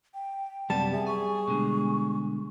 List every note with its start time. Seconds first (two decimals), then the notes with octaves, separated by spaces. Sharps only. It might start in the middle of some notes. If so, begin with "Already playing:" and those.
0.14 G5
0.70 F#2 C3 G3 B3 A5
0.92 G#4 E5
1.07 G#5 C#6
1.48 B2 D3 G#3